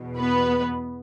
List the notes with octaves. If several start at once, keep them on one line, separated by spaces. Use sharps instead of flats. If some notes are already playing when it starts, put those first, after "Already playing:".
Already playing: E2 B2
B3 B4